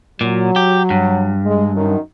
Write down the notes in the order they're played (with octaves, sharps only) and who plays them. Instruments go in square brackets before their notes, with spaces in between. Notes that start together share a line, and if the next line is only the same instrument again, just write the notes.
[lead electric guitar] A#2 [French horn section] F#3
[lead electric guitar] G4
G2
[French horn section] G#3
F#2 D#3